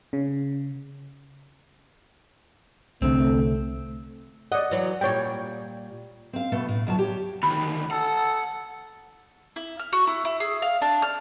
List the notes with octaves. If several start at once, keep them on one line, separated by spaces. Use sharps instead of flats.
C#3
C2 D3 A3 C4
D5 D#5 F#5
E3 F#3
A#2 G3 C#5 G5
C4 F5
B2 A3 B3
A2
D2 F#3 F4 A5
G4 C#5
D2 D#3 B5
A4 F#5
E4
F6
F#4
E4
E4
G#4
F5
D4
F6